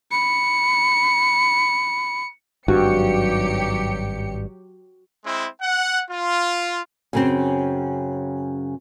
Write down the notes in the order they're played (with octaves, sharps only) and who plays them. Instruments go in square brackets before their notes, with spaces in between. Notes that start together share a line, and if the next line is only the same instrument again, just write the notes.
[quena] B5 [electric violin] C#7
[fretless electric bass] G#1 G2 [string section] F#3 G4 C#7 [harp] F#4
[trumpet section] G#3 C4 E4
F#5
F4
[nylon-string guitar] F#2 C#3 C4